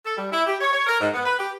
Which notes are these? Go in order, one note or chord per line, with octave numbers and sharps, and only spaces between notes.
A4
G3
E4
G4
C#5
C#5
A#4
G#2
B3
B4
G4